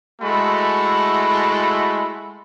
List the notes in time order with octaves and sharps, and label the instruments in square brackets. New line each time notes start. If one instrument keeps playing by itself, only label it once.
[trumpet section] G#3 A3 E4 F#4 A4 B5